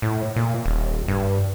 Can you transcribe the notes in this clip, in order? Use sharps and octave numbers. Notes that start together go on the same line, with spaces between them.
A2
A#2
D#1
G2